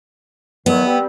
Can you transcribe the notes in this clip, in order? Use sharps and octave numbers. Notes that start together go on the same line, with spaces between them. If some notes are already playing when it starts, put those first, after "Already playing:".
E2 D#3 F#3 B3
G3 C4